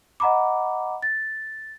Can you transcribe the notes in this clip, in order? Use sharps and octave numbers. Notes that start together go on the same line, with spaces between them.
D#5 F#5 A#5 B5 D6
A6